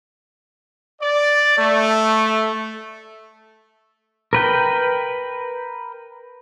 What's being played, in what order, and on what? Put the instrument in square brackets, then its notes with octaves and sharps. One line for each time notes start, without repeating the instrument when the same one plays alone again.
[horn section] D5
A3
[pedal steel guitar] A#4 B4 G5